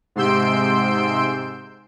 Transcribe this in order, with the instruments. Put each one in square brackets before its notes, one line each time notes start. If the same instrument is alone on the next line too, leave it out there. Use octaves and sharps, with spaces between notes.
[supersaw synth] G#2 C3 C6 E6 G6 D7